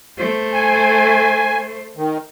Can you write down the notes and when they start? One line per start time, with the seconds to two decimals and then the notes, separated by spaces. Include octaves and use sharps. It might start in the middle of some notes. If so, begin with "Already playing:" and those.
0.17 A3 C5
0.54 G#5
1.97 D#3